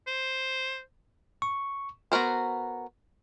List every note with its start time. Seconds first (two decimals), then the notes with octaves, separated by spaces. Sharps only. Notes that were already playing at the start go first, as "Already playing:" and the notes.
0.07 C5
1.42 C#6
2.12 B3 F#4 A#4 C5